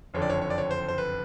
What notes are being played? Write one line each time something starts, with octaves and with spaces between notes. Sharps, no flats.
F#1 F2 D3 C#5
D5
C#5
C#5
D5
C#5
C5
C5
B4